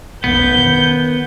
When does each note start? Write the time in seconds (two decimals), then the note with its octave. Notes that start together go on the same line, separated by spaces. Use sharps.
0.24 F1 B1 B3 G6
0.57 D#3